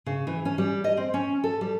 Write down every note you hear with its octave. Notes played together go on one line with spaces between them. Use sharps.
C#3
E3
C#4
G3
D#5
C4
C#4
A4
G3